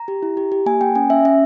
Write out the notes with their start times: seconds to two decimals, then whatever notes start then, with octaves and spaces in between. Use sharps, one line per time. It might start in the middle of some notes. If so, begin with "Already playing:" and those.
Already playing: A#5
0.08 G4
0.22 E4
0.37 G4
0.52 G4
0.66 A#3 G#5
0.81 A#3 G5
0.95 C#4 G#5
1.10 C#4 E5
1.25 C#4 E5